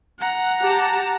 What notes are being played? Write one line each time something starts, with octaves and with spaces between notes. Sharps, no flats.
F#5 A#5
G4 A5